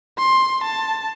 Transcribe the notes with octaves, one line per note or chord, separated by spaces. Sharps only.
C6
A5